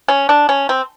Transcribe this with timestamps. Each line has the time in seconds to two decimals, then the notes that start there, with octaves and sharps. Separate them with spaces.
0.08 C#4
0.29 D4
0.49 C#4
0.69 C4